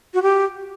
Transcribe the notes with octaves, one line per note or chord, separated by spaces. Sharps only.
F#4
G4